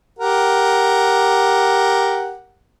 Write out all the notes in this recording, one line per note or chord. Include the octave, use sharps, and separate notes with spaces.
G4 A#4 F#5